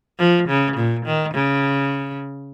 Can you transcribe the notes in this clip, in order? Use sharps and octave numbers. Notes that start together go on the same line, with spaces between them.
F3
C#3
A#2
D#3
C#3